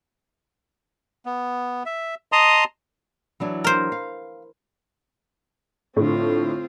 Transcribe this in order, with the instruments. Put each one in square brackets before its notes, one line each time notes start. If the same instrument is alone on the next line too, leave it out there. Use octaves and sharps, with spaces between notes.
[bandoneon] B3
E5
D#5 A5 A#5 C6 D#6
[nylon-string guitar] E3 F#3 D4
[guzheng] A#4 C5
[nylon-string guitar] F5
[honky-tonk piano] A2 D3 [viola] C4 F4